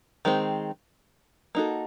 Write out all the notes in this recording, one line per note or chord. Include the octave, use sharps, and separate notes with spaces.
D#3 G#3 C4
A#3 D#4 F#4 A4